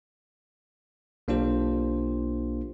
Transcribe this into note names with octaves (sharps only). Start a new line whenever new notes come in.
B1 A#3 D4 F4 G4 C5